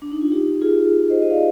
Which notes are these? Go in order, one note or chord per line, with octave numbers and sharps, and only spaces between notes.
D4
D#4
F4
D#4 G4
F4 G#4
C5 D#5
D#5
D5 F5